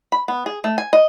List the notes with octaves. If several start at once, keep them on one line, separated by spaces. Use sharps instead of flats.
B5
B3
G#4
A3
G#5
D#5